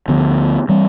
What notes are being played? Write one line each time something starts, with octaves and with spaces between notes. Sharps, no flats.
D2 D3 F3 B3
E3 G3 C4